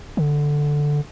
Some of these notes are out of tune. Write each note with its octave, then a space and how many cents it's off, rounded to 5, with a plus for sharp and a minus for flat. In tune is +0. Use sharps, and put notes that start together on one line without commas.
D3 +0